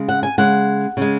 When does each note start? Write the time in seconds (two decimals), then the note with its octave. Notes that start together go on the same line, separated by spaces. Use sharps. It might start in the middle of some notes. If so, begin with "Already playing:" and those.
Already playing: C#3 G#3
0.09 F#5
0.23 G#5
0.38 C#3 G#3 F#5
0.97 C#3 G#3